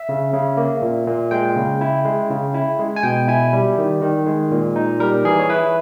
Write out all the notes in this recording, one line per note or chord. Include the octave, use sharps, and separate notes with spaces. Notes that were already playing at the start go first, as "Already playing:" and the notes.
Already playing: E5
C#3
C#3
A#3
A#2
A#2
G#3 G5
C#3
E4
G#3
C#3
E4
G#3
G#5
B2 G5
E4 G#5
G3
D#3
D#3
G#3
A#2
D#4
G3 A#4
E3 G#4
C#5
E4 B4